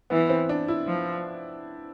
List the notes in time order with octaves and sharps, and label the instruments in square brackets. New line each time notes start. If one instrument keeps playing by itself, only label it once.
[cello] E3 [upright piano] B3
[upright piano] C4
D4
E4
[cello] F3